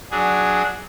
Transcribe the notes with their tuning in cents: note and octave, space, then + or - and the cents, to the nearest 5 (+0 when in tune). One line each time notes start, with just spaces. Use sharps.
F#3 +0 D4 +0 G#4 +0